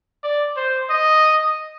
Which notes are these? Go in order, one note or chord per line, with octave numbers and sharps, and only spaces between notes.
D5
C5
D#5